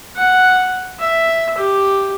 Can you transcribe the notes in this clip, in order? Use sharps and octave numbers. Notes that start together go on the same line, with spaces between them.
F#5
E5
G4